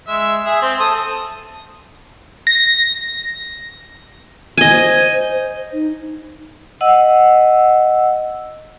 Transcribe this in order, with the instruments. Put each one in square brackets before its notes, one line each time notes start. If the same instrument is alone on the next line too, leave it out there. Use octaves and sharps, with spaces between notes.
[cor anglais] G#3 [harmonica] E5
[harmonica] G#4 [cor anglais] E5
[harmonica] C4 [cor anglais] C5
[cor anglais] A4 [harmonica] D#6
[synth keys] A#6
[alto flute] E4 [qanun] D#5 G#5
[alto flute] C5
D#4
[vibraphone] D#5 F#5 E6